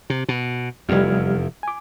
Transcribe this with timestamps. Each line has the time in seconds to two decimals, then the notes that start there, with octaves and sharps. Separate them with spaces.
0.10 C3
0.29 B2
0.89 F1 E2 G3 F6 G#6
1.63 G#5 D6